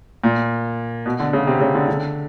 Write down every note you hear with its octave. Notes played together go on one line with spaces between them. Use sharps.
A#2
B2
D3
C#3
C3
C#3
D3
D3